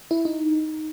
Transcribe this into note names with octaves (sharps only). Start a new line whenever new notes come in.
E4
D#4